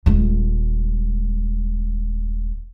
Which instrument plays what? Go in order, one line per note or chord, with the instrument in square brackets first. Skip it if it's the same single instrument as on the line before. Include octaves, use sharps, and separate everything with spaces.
[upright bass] D#1 G#3